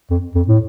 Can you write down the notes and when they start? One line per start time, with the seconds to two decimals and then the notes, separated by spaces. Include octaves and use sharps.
0.10 F2
0.35 F2
0.48 A2